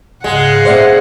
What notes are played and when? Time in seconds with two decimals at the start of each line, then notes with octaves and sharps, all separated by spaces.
0.24 C#2 G#2 C#3 G#3 F5 F#5
0.65 A#2 A3 C4 C5 D5 E5